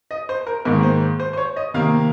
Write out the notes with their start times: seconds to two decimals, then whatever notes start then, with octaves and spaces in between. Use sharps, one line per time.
0.11 D#5
0.29 C5
0.47 A#4
0.65 G#2 D#3 A#3 A#4
0.83 C5
1.20 C5
1.33 C5
1.37 C#5
1.56 D#5
1.74 C3 D#3 A#3 F5